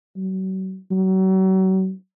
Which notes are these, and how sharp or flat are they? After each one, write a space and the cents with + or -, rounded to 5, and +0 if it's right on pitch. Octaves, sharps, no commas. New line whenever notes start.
F#3 +35
F#3 +35